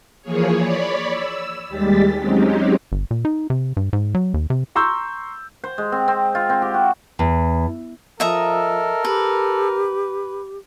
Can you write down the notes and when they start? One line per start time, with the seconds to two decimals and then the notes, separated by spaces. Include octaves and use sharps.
0.22 E3 F3 A#3 G#4 C#5
0.56 C#5 D5 B5
1.11 E6
1.69 D#2 G3 G#3 G4 A6 B6
2.18 F#3 G#3 C4 C#4 D#4 G4
2.92 G1
3.11 A#2
3.25 D#4
3.50 C3
3.77 G2
3.93 G#2
4.15 F#3
4.34 D#2
4.50 C3
4.75 A#5 C6 C#6 E6 G6
5.64 C5
5.78 G#3
5.92 C4
6.08 C4
6.35 F4
6.50 C4
6.62 G4
6.74 F#4
7.19 E2
8.20 F3 A4 A#4 D#5 E5 A#5
9.05 G4 B4